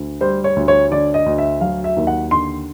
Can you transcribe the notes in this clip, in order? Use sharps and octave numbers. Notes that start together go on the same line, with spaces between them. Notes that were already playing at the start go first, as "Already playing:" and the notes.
Already playing: D2
G3 C5
C#5
D2
C#5
D3 D5
D#5
D2
E5
F#3 F5
E5
D#2
F#5
D3 C6